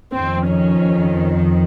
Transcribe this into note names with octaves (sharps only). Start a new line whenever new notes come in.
F2 D#3 C4
C#4